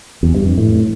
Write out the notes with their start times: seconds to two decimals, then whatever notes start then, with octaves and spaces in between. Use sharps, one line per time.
0.23 E2
0.34 G2
0.46 F2
0.58 A2